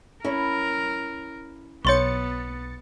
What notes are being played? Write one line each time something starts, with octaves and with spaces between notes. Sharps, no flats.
C#4 E4 A#4
B1 B3 C#5 C6 C#6 A6 C#7